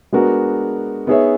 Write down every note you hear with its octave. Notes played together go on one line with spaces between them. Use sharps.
G#3 B3 D4 F#4 A#4
B3 D#4 G#4 C#5 E5